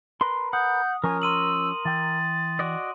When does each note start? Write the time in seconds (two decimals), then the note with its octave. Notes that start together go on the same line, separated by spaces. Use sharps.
0.21 A#4 B4 C6
0.53 F#5 D#6 G6
1.04 F3 C#4 A#4 C#5 G#5
1.22 C6 E6 D#7 F#7
1.85 E3 G5 A6
2.59 F#4 D5 D#5